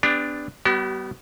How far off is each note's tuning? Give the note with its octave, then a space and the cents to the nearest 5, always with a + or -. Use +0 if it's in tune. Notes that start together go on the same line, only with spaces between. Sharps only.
B3 +25 D4 +0 G4 +35
G3 -25 B3 +0 G4 -45